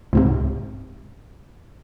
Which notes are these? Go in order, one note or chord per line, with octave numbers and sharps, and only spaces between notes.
C#2 G#2 C3